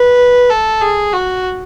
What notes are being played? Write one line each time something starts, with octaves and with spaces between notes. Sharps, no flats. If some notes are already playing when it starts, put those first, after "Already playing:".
Already playing: B4
A4
G#4
F#4